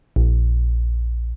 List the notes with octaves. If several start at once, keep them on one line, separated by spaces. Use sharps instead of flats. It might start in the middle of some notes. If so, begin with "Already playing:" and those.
A#1